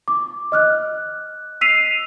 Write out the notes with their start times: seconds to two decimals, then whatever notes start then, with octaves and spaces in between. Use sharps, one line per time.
0.08 D6
0.52 D#5 F6 F#6
1.61 E6 B6 C7 D#7 F7